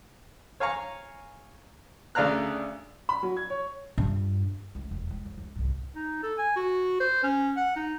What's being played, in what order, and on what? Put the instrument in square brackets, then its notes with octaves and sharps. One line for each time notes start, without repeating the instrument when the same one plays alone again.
[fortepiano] C#5 F5 G#5 A#5 C#6
D2 C#3 D5 F5 A#5 F#6
[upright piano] B5
F#3
G#6
C#5
[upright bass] G2 F4
C#2 A3
E1 F2
G#3
F2
C#2
C2 G#2
[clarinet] D#4
A4
G#5
F#4
C5
C#4
F#5
D#4